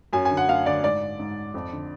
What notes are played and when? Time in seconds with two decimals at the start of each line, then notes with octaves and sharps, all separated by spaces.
0.13 F#2 G#5
0.25 G#5
0.30 D3
0.37 F#5
0.48 F#2 F5
0.66 D3 D5
0.83 G#2 D5
1.19 G#2
1.54 F2
1.72 D3